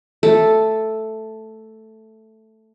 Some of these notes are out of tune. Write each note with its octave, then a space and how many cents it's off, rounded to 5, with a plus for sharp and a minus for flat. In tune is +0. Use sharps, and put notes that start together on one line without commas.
A3 +0 A4 +0